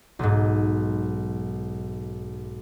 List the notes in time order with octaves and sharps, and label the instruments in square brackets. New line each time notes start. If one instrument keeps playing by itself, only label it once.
[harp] B1 G#2